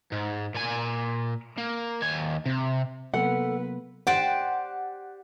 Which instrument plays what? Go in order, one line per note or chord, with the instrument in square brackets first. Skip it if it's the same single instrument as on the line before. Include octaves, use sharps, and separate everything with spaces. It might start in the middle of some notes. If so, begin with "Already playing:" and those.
[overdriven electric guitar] G#2
A#2 G#5
A#3
D#2 G#5
C3
[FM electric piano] C3 F#3 B3 [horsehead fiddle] A#3 B4 [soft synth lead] A4 [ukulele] F#5
[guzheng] G4 C5 D5 [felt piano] F#5